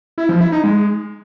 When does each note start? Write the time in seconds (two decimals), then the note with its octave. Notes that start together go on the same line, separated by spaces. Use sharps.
0.18 E4
0.29 F3
0.41 E4
0.52 D#4
0.64 G#3